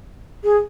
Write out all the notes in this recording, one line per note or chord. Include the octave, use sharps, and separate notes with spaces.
G#4